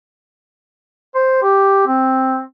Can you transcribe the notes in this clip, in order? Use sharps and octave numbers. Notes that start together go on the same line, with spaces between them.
C5
G4
C4